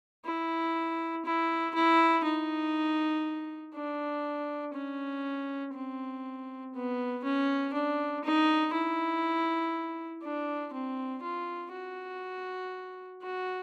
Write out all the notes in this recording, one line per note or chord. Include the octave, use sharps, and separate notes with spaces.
E4
E4
E4
D#4
D4
C#4
C4
B3
C#4
D4
D#4
E4
D4
C4
F4
F#4
F#4